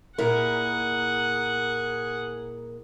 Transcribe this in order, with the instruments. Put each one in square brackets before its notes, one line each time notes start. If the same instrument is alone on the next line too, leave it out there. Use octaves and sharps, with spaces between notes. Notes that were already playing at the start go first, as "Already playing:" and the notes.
[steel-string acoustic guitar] A#2 E4 A#4 [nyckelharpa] G#4 F#5